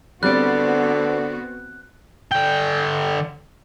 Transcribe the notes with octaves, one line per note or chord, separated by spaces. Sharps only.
D3 G3 B3 C4 F#4 D5 F#6
D3 G5